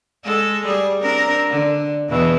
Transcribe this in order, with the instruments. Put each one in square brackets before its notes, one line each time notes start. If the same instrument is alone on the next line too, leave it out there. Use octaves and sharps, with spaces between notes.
[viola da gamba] G#3 A4
G3 G#4
C4 D4 A#4
D3
E2 B2 E3